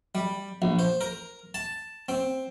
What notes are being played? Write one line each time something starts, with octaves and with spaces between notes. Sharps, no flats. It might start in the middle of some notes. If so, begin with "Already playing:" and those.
G3
A#1
C5
A#4
A5
C4